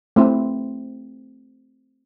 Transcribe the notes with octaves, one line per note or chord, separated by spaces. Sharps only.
A3 C4 E4